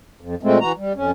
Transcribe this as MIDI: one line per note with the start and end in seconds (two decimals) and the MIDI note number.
0.21 0.35 41
0.43 0.59 46
0.43 0.59 56
0.43 0.59 57
0.43 0.59 60
0.61 0.72 52
0.61 0.72 66
0.61 0.72 82
0.77 0.93 55
0.95 1.11 41
0.95 1.11 61